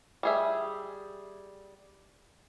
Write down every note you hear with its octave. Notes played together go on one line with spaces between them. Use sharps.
G3 G#4 E5